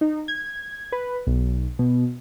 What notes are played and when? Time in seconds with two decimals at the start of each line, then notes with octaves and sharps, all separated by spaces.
0.01 D#4
0.28 G#6
0.92 B4
1.27 B1
1.79 B2